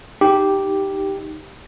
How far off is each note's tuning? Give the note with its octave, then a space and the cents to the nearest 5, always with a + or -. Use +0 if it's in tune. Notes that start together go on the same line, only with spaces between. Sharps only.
D#4 +0 G4 -5